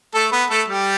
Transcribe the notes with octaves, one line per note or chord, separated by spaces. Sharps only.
A3 A4
B3 B4
A3 A4
G3 G4